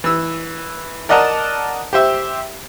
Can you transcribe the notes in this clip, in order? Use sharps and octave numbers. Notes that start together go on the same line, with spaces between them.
E3 E6
A#4 D5 D#5 F#5 A5 A#5
G4 C5 E5